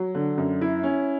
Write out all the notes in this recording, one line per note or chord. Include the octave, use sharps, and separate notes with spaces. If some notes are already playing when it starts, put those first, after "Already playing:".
Already playing: F#3
D3
F#2
E4
C#4